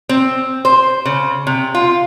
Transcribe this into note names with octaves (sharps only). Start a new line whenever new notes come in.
C4
C5
C#3
C3
F4